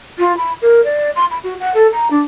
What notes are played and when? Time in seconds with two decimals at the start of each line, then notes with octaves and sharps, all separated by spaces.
0.19 F4
0.37 B5
0.62 A#4
0.84 D5
1.16 C6
1.31 B5
1.44 F#4
1.60 F#5
1.75 A4
1.92 A#5
2.11 D4